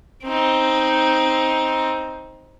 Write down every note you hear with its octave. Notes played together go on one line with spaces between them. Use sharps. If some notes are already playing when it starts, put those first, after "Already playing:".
C4 D#4